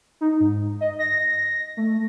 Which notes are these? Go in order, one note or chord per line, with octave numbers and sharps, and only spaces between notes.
D#4
G#2
D#5
A#6
A3